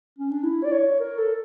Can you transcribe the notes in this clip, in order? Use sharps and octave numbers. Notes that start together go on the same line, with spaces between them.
C#4
D4
E4
D5
C#5
A#4
A4